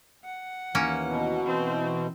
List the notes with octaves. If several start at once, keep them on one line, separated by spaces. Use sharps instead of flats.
F#5
D#2 E3 A#3 C#4
B2
E3 C4 C5